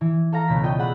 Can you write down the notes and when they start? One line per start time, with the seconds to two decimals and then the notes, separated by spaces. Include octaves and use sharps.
0.01 E3
0.32 A4 F5 A#5
0.48 C#2 B2 A3 B6
0.63 F4 D5 D#5 G5
0.78 G#4 F#5 B5 E6